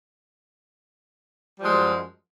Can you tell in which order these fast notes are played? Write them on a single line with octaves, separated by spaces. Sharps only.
G3 F3 G#3 F#2